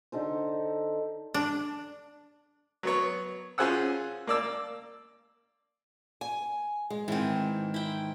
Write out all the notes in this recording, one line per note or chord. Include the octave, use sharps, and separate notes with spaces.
D3 D#4 A4 C5
D4
F#3 B3 C#5
C#4 F4 G#4 C5 F#5 E6
A#3 D5 E6
G#5
G#3
G#2 D#3 E3 C4
E4 G5